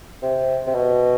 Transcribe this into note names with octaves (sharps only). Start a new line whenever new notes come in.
C3
C3
B2